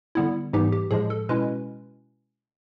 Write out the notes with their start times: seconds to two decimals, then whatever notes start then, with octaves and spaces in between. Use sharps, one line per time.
0.15 D3 G3 B3 E4
0.53 G#2 E3 G3 B3 D#4 G4
0.72 G4
0.91 A2 F3 G#3 G#4
1.10 A4
1.29 B2 G#3 C#4 E4 B4